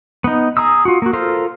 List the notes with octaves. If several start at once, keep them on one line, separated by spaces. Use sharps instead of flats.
B3 D#4
G#4 A#5 D#6 E6
F4 F#4
A#3 F#4
F4 A4 A#4 C5